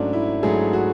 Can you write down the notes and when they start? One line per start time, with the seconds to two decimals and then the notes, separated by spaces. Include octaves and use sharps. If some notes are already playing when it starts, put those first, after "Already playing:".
Already playing: G#2 F#3 A3 C#4 D4
0.13 E4
0.43 G#2 F#3 A3 G#4
0.73 F#4